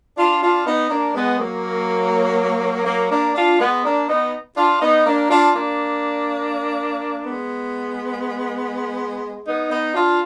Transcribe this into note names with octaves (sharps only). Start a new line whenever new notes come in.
D4 F4
D4 F4
B3 D#4
A#3 D4
G#3 B3
F#3 A#3
F#3 A#3
A#3 D4
D4 F4
G#3 B3
A#3 D4
B3 D#4
D4 F4
B3 D#4
A#3 D4
D4 F4
A#3 D4
G#3 B3
B3 D#4
B3 D#4
D4 F4